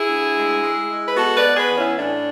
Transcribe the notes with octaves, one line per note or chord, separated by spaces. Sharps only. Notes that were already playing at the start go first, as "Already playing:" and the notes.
Already playing: E4 G#4
D2
G#3
G#3
G#3
B4
B3 F#4 A4
B4 D5
B3
G#4 B4
E3
C#4 E4
A2 D4